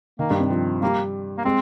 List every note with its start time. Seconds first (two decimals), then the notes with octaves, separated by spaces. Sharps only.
0.19 D#3 A#3
0.30 G2
0.40 C3
0.50 F3
0.82 G3 A#3
1.38 A#3
1.45 G#3 C4